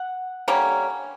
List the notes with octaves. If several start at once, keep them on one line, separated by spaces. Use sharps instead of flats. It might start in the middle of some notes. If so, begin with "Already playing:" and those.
Already playing: F#5
D3 G3 A#3 C#4